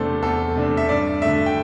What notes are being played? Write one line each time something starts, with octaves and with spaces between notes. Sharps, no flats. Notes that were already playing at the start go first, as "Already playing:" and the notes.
Already playing: E2 C3 A3 D4 A4 C5
E2 A4
C3 A3 D4
E5
G2 D5
D3 A3 E5
G5